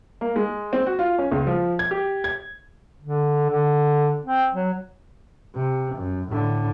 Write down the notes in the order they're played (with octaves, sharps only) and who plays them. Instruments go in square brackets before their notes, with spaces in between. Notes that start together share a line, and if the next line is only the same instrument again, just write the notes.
[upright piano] A#3
G#3
C4
F#4
F4
C#4
C#2
F3
G#6
G4
G#6
[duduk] D3
D3
C4
F#3
[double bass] C3
F#2
A2 D3